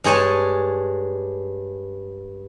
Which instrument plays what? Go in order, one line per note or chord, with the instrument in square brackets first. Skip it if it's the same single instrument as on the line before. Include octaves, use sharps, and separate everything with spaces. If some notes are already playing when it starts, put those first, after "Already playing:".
[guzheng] G2 G#3 G#4 C#5 G#5 A5